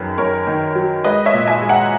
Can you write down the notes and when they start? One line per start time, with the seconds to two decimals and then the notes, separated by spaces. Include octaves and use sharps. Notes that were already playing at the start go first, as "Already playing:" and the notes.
Already playing: F#2 D#3 G#4 A#4 B4
0.18 F#2 A#4 C#5
0.47 D#3
0.75 F#3
1.04 G#3 B4 D#5
1.26 C#5 E5
1.33 A#2
1.47 E5 G#5
1.62 G#3
1.69 F#5 A#5